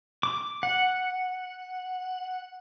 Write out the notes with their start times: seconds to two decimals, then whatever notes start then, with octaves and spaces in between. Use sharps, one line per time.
0.23 D6
0.63 F#5